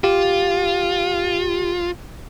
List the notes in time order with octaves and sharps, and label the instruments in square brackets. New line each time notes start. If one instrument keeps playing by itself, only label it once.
[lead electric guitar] F4 [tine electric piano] G4